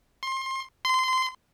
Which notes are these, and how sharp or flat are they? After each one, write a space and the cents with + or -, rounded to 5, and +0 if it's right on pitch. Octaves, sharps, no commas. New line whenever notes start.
C6 +25
C6 -20